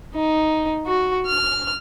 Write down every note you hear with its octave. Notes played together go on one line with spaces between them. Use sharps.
D#4
F#4
F6